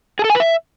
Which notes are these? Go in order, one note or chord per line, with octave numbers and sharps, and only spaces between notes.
G#4
A4
G#5
B4
E5